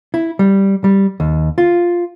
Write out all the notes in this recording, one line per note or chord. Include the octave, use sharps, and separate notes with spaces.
E4
G3
G3
D#2
F4